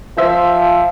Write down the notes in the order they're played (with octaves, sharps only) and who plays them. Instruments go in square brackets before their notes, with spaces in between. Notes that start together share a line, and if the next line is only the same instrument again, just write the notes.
[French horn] F3 [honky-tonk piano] C5 E5